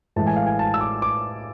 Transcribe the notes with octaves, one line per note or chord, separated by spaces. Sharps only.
A2 E3 G#3 A5
G#5
F5
G#5
A5
E6
D6
D6